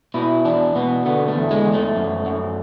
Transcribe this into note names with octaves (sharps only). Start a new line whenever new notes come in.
B2 E4
E2 D4
B2 B3
D3 B3
A3
E2
G#3
E2
A3
F#2
F#2